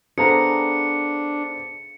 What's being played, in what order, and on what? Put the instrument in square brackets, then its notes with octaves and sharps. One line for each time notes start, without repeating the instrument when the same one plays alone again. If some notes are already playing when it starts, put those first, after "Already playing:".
[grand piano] B3 A4 C5 [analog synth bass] D4 [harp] G#4 F5 A#5 [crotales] C#7